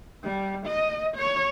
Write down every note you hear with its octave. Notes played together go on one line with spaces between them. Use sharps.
G3
D#5
C#5